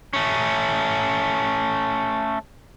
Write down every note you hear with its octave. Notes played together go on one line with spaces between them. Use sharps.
A3 C#4